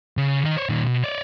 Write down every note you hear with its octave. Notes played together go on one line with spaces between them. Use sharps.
C#3
D#3 D#5
C5 C#5
A#2 D#3
B2
C#5 D5